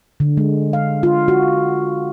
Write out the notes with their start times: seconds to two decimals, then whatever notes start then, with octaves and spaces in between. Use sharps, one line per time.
0.20 D3
0.37 G#3
0.73 F5
1.03 F4
1.28 F#4